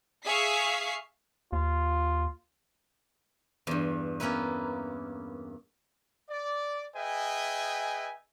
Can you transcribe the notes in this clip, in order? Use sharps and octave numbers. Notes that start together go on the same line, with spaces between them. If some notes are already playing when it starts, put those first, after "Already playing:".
G#4 E5 F5 C#6 B6 C7
D#2 F4
E2 G2
A#3 B3 C#4 E4 B4
D5
G#4 B4 D#5 E5 G5 G#5